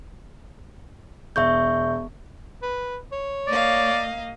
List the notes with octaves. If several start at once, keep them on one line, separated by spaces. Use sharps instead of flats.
E1 E5 C#6 G6
B4
C#5
A#3 D5 D#5 F5